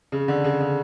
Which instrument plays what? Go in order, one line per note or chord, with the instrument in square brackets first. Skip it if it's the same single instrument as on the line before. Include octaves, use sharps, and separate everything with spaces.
[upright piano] C#3
D3
C#3
C#3